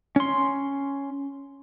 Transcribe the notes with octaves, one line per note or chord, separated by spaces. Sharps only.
C#4 C6